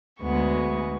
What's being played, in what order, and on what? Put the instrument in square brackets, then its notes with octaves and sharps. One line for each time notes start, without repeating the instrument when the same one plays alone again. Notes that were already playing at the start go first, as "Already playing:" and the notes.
[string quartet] D2 G#3 B3 C#6